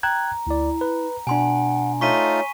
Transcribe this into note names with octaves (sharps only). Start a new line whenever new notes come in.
G5 A#5 F#6 G#6
D2 E4 D5
B4
B2 D4 F#5 G#5 C6
A3 D#4 F4 C#5 C#6 B6 D#7